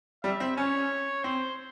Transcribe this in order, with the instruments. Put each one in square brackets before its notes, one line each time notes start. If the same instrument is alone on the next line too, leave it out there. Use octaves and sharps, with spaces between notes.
[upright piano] G3 [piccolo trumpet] E5
[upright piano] C4
[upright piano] C#4 [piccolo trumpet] C#5
[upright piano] C4 [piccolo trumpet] C5